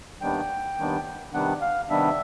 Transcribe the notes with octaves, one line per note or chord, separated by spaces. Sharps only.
D#2 D#3 G3 B3 D4 G5
D#2 D#3 G3 B3 D4
C3 D#3 G3 B3 D4 F#5
F5
C3 D#3 G3 B3 D4 E5